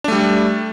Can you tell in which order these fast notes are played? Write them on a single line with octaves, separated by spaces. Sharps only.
D4 A3 G3